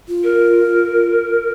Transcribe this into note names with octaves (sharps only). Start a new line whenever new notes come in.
F4
A#4